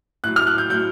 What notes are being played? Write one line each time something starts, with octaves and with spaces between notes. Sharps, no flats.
A2 F#3 F#6
F6
F#6
G6
A2 F#3 G6